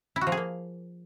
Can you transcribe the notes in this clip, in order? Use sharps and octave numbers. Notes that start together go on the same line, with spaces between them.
E4
F#4
F3
G#4
A#3